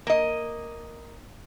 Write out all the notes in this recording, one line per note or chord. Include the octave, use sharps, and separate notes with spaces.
A#3 D#5